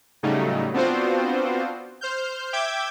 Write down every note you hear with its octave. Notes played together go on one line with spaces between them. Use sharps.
A2 C#3 F#3 G3 A3 D#4
B3 C4 D4 F4 F#4 C5
C5 F6 G6
E5 G5 D6 G6 G#6